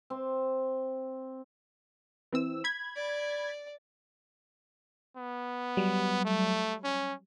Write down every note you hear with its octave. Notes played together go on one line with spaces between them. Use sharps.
C4
E3 C4 E6
B5 G#6
D5
B3
F#3 G3
A3
C#4